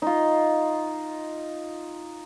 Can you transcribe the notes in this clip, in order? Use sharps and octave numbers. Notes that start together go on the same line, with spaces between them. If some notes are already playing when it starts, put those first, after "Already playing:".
D#4 F4